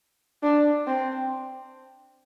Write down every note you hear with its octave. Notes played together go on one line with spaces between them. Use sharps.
D4
C4